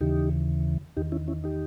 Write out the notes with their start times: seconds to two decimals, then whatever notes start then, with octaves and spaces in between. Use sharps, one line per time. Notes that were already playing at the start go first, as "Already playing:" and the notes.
0.01 D#2 C#3 E3 D#4 G4
0.97 E2 D#3 D#4 G4
1.12 C#4 E4
1.28 C#4 E4
1.44 D#4 G4